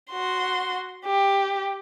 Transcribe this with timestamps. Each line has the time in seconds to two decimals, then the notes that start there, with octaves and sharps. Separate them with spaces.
0.11 F#4 C6
1.06 G4